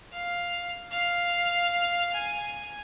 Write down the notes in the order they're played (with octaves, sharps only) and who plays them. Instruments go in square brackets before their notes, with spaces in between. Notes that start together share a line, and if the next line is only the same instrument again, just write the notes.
[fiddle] F5
F5
G#5